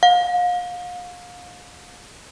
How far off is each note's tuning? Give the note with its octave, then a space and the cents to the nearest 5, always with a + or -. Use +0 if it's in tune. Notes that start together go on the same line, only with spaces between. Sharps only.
F5 +35